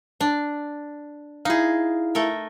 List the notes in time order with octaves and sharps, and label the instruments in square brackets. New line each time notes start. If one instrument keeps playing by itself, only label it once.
[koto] D4
[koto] D#4 G#4 [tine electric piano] E4 F5
[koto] A3 A4 A#4